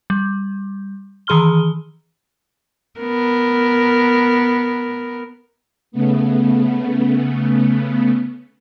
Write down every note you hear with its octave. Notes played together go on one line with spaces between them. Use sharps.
G3
D#3 E3 G#4 C6 F6 G7
B3 A#4
C#3 A3 B3